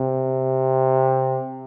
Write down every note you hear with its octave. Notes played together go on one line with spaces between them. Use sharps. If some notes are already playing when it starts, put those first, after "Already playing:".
Already playing: C3